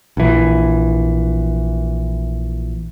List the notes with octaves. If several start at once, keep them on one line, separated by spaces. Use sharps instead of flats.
A#1 E3